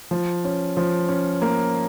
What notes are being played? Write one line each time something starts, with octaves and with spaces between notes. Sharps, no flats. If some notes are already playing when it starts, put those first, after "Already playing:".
F3
C#4
F3
C#4
A#3